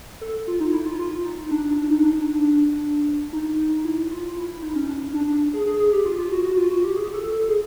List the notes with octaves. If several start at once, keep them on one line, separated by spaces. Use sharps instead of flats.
A4
F4
D#4
E4
F4
F4
D#4
D4
D4
D#4
D4
D4
D4
D#4
E4
F4
E4
E4
D#4
C#4
D4
D4
D4
G#4
G#4
G#4
G4
F4
F4
F#4
F#4
F4
F#4
G4
G#4
A4
A4
G#4